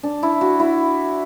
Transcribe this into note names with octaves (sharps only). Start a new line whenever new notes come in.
D4
E4
F#4
E4